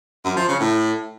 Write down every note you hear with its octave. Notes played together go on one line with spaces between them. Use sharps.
F#2
F3
C#3
A2